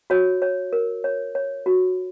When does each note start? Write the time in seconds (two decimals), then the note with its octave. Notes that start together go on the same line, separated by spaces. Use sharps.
0.10 F#4 C#5
0.42 C#5
0.73 A#4
1.04 C#5
1.35 C#5
1.66 F#4